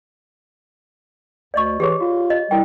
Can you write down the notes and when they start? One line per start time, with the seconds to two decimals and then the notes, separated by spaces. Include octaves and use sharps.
1.54 D2 D5 D#5 C#6
1.80 E3 G4 G#4 C#5
2.00 F4 F#4
2.30 D#5
2.51 G3 E4 A#4 G5